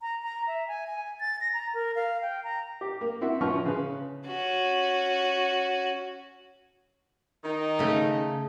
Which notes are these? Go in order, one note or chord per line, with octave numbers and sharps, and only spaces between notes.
A#5
A#5
E5
G#5
G#5
A6
A#6
A#5
A#4
F5
G5
A#5
G4
A#3
C4 E4 F#4
F3 B3 C#4 F#4 C#6 F6
C#3 B4
C#4 F#4
D#3 D#4
C#3 A3